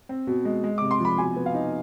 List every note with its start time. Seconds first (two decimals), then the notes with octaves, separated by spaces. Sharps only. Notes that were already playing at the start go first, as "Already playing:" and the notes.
0.09 C4
0.27 B2
0.45 G#3
0.64 G#3
0.78 C3 D6
0.91 C6
1.00 F3 B5
1.18 B2 G#5
1.36 B3
1.46 F5
1.55 D#4